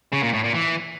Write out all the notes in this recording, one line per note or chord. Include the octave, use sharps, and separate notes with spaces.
C#3
A#2
A2
A#2
E3